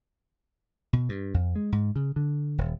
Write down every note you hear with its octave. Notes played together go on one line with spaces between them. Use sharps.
B2
G2
F2
G#3
G#2
C#3
D3
D#1